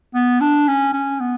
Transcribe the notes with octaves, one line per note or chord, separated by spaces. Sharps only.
B3
D4
C#4
C#4
B3